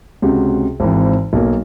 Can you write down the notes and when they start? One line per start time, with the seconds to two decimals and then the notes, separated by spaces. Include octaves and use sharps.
0.22 C#2 C3 F#4
0.80 G#1 E3 C4
1.33 B1 A#3